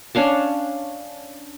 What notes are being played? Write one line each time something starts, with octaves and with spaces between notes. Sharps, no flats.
C#4 D4 F5 A5